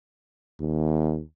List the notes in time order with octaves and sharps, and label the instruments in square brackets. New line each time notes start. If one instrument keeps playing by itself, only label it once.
[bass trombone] D#2